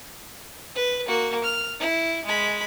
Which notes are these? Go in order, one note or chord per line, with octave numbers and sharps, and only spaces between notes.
B4
A#3 F#4
F6
E4
G#3 B5